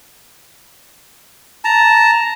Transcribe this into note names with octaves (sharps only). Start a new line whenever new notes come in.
A5 A#5